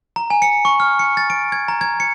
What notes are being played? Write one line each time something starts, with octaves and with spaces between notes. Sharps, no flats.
A#5
G#5
C#7
C#6
F6
C#7
A6
D7
G#6
A#5
G#6
C#7